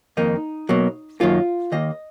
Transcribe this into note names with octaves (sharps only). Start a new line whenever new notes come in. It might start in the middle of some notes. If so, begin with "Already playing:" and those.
F2 D#3 A#3 D#4
B2 F#3 A#3
F#2 D#3 F#3 A#3 F4
D#2 D#3 A#3 D#5